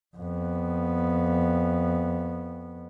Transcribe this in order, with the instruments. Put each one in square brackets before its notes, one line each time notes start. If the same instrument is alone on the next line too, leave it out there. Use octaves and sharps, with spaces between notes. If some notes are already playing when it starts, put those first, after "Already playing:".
[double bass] F2 B3